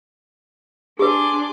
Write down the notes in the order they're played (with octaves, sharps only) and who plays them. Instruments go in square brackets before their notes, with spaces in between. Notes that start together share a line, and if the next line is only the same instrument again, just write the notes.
[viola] D4 [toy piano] G4 B4 [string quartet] G#4 C6 D6